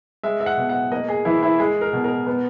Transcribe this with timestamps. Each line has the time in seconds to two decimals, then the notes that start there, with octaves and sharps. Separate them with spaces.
0.23 G#3 E5
0.40 E5
0.46 F#5
0.57 B2
0.69 F#5
0.92 A#3 D#5
1.08 G#4
1.25 E3 E4
1.43 E4
1.59 G#3 G#4
1.81 A#4
1.93 B2
2.04 A#4
2.27 B3